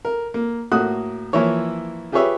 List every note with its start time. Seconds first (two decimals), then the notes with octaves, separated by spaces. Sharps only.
0.05 A#4
0.34 A#3
0.72 A2 A#3 F#4 D#6 F#6
1.33 E3 F3 A#3 E4 C#5
2.12 F4 G4 G#4 B4 C#5 E5